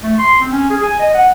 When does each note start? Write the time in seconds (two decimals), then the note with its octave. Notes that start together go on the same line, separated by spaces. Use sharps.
0.03 A3
0.18 C6
0.41 C4
0.52 C#4
0.70 G#4
0.83 G#5
0.99 D#5
1.15 F#5